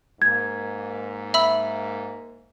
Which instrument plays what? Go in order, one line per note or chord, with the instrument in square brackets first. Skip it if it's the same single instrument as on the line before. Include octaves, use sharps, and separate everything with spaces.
[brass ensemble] G#2 A#3 [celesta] G#6
[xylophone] E5 B5 E6